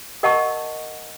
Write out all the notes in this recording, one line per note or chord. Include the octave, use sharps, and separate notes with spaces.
A#4 D#5 F#5 A5 C#6